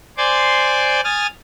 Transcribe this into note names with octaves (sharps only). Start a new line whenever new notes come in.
C5 D5 G#5 C6 D6
G#5 D#6 F6 A6